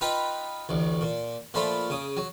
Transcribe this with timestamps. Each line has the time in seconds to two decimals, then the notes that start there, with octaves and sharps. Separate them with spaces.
0.01 D#4 F4 B4 G5 B5
0.69 A1 D2
1.01 A#2
1.54 A#2 F3 A3 F4 B5
1.90 C#3 D#6
2.17 F#3